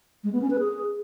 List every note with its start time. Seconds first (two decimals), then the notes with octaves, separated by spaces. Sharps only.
0.24 G#3
0.33 B3
0.42 C#4
0.50 B4
0.59 G#4